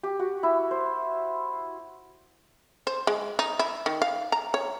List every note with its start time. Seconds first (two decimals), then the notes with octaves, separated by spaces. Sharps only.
0.03 G4
0.19 F#4
0.43 E4
0.71 C5
2.87 C5
3.07 G#3
3.39 D#4
3.59 E4
3.86 D#3
4.02 F5
4.32 A#5
4.54 C#5